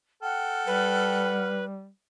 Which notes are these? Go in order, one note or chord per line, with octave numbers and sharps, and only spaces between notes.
A4 F#5 G5 F6
G3 B4